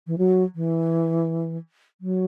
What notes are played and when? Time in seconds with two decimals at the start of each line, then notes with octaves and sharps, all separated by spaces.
0.07 E3
0.18 F#3
0.55 E3
2.01 F#3